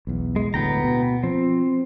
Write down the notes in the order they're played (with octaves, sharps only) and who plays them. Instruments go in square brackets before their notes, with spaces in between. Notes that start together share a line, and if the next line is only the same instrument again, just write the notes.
[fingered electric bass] B1 E2
[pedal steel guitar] G#3
[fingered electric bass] D2 A2 [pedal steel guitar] B3 G5 A#5
[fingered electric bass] B2
[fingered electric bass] F3 [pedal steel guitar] C4